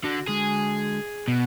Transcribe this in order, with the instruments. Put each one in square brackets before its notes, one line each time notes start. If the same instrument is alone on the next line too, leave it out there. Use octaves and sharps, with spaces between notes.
[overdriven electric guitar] D3 [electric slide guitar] F#4
[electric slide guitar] D3 G#3 F#4 [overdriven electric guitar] G#4
[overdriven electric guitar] B2